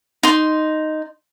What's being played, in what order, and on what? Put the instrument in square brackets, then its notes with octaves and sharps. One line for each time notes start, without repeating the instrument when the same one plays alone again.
[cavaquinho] D#4 C6